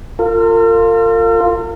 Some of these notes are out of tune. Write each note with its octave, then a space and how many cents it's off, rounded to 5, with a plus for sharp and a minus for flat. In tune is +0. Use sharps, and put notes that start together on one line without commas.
F4 +0 A#4 -45